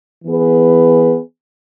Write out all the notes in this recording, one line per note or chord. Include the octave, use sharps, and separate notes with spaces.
E3 B3 G#4 B4